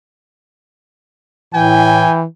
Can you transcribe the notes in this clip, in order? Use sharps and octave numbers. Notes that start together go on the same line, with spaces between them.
A2 E3 G5 G#5